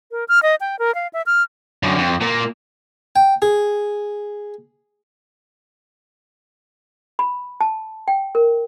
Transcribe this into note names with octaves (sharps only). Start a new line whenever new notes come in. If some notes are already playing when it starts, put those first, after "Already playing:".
A#4
F6
D#5
G5
A#4
F5
E5
F6
F#2 D3
F2
A#2 A#3
G5
G#4
B5
A5
G5
A#4